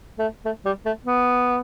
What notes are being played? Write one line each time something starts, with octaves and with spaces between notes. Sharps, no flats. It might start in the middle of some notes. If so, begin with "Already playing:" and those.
A3
A3
G3
A3
B3